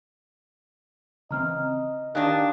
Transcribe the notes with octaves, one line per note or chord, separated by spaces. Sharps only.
C#3 E3 C4 D#5 A#5 F6
D#3 D4 G4 F5 G#5 F#6